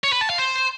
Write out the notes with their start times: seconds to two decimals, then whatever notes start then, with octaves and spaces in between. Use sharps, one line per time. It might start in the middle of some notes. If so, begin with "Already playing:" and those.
0.04 C#5
0.13 B4
0.21 A5
0.30 F5
0.38 C5